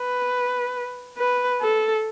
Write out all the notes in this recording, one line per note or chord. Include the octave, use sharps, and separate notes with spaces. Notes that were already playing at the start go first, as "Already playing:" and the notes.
Already playing: B4
B4
A4